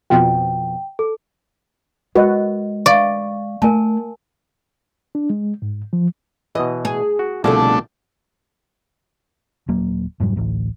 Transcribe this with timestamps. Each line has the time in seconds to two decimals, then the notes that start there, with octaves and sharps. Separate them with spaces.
0.10 F2 B2 F3 G5
0.99 A4
2.15 G#3 F#4 A#4 B4 D#5
2.86 D5 F5 C#6
3.62 A3 A#4 G#5 A5
5.15 D4
5.30 G#3
5.62 G#2
5.93 F3
6.55 B2 E3 D#5
6.85 G#4
7.19 F#4
7.44 C2 B2 D3 F3 A3 D4 G#4 A4
9.68 D#1 F#3 A#3
10.20 F1 G#2 F#3 G3
10.36 D1 A1 A2